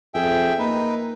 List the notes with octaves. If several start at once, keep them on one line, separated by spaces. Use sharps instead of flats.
F2 G#4 E5 G5
A#3 D#4 B4